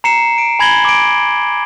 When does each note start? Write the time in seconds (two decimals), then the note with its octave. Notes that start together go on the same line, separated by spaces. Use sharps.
0.04 A#5 C7 C#7 E7
0.38 D7
0.59 G#5 B5 G#6 A#6 F#7 G7
0.85 D6 D7